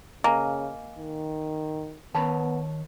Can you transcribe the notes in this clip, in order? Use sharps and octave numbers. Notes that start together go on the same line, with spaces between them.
C#3 A#3 D#5 G#5
D#3
D#3 B3 C#5 A5 B5